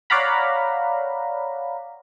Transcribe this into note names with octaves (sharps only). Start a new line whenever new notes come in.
C#5 D5 F5 F#5 A#5 B5